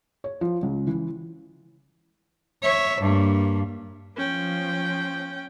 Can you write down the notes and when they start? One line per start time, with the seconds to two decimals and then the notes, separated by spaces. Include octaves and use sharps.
0.24 C#5
0.41 F3
0.63 C#2
0.87 E3
2.63 C#5 E5
3.01 G2 A#3
4.17 F3 C#4 G5